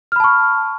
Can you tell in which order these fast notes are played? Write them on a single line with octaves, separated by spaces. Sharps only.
F6 B5 A5 C#6